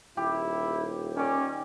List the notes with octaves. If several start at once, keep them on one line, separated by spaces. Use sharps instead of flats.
D#1 E4 G4
D#3 C#4 D5